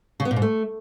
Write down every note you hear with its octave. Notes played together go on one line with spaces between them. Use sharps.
C#3
B3
A#2
G#2
A3